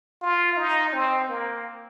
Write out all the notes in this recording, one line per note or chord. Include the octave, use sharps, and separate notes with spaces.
F4
D#4
C4
A#3